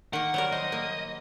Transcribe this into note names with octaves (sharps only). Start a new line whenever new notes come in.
D#3 A#3 F#5
F#3 G3 A#4
C5 D#5
A#3